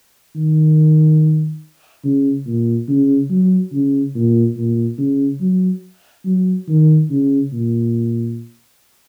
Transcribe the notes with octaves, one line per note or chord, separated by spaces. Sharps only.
D#3
C#3
A#2
C#3
F#3
C#3
A#2
A#2
C#3
F#3
F#3
D#3
C#3
A#2